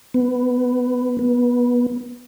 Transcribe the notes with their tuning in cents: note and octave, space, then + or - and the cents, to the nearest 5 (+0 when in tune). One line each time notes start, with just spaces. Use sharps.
B3 +15
B3 -20